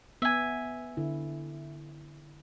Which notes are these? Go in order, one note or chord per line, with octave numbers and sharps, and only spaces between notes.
B3 E5 G#5
D3 E4